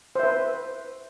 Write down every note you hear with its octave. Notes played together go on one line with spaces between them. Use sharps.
B4 C5 E5